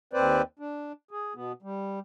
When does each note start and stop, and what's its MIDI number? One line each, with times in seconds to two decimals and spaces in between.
0.13 0.42 39
0.13 0.42 60
0.13 0.42 71
0.13 0.42 72
0.13 0.42 74
0.59 0.92 62
1.11 1.34 68
1.35 1.52 47
1.35 1.52 59
1.62 1.99 55